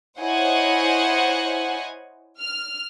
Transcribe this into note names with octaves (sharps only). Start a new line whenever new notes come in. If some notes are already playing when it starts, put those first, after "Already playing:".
E4 C5 C#5 D#5 F#5 G#5
F6